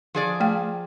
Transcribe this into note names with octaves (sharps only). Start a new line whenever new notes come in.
F3 G#4 D5
A3 G5